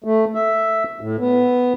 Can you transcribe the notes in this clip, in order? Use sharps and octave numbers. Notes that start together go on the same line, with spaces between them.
A3
E5
A2
B3